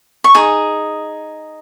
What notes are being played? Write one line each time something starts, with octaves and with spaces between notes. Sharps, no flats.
C#6
D#4 G#4